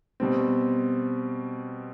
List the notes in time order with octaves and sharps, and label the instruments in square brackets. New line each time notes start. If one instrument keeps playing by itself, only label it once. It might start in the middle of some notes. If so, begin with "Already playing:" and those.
[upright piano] B2 G3 C4